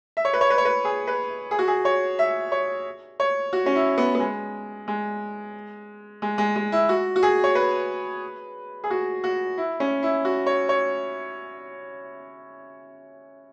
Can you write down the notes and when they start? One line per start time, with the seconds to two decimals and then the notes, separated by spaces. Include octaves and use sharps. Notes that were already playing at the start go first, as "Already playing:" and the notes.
0.17 E5
0.25 C#5
0.33 B4
0.41 C#5
0.50 B4
0.58 C#5
0.65 B4
0.85 G#4
1.07 B4
1.51 G#4
1.59 F#4
1.67 G#4
1.85 C#5
2.19 E5
2.52 C#5
3.20 C#5
3.53 F#4
3.66 C#4
3.75 E4
3.98 B3
4.15 B3
4.20 G#3
4.88 G#3
6.22 G#3
6.38 G#3
6.56 G#3
6.72 E4
6.89 F#4
7.16 F#4
7.23 G#4
7.44 C#5
7.55 B4
8.84 G#4
8.90 F#4
9.24 F#4
9.58 E4
9.80 C#4
10.03 E4
10.25 F#4
10.46 C#5
10.69 C#5